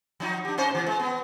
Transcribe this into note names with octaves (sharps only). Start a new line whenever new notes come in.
F3 F#3 D#4
D4 G4
C#4 D#4 C5
B2 E3
G#3
B3